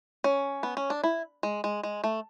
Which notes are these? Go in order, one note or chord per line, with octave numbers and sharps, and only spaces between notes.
C#4
B3
C#4
D4
E4
G#3
G#3
G#3
A3